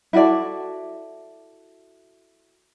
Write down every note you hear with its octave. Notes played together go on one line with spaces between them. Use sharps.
E4 F#4 A4 D5